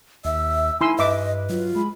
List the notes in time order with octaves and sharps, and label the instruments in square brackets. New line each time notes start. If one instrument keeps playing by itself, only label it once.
[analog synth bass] D#2 [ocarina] E5 [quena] E6
[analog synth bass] D#4 [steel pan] E4 C6 E6 [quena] G#5
[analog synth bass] G2 [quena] B4 [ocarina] D#5 [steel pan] E5 D6
[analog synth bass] F#3 [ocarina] F4
[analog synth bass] G#3 [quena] B5